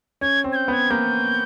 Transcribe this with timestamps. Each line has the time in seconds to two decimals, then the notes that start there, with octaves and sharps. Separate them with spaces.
0.21 C#4 G#6
0.44 C4
0.52 G#6
0.56 G6
0.68 B3
0.73 G#6
0.91 A#3 G6